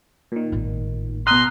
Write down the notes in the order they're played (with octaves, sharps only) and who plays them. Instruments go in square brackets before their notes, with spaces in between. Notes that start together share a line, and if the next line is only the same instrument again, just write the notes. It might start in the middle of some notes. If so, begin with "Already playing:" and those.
[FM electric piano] A#2 D#3
[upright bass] G#1 A2
[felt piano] B2 F#6 [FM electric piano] A#5 D#6 F6 [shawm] C6